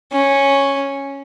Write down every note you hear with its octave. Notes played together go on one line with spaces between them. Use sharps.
C#4